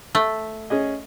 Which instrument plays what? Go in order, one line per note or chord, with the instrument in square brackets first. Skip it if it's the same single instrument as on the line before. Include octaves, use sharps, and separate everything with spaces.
[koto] A3
[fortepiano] C#4 G#4 D#5